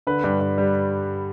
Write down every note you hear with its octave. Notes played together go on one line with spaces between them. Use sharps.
D3 B4
G2
G2
G3